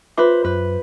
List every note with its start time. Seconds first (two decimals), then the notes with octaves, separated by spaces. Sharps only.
0.18 F4 B4 C5 E5 D6
0.44 F#2 B4